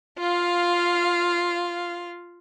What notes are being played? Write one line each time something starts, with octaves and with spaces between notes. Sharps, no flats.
F4 F5